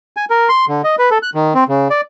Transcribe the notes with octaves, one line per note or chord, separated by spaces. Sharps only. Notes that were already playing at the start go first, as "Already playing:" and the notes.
G#5
A#4
C6
D3
D#5
B4
A4
F#6
D#3
C4
C#3
D5